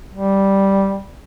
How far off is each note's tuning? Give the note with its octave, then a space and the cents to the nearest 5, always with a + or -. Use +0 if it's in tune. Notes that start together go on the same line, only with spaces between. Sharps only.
G3 -5